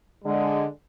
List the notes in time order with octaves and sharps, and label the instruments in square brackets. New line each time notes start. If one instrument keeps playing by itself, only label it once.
[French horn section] D3 G#3